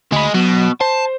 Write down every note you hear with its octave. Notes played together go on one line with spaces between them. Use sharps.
D2 G#3 B5
B2 F#3
C5 A5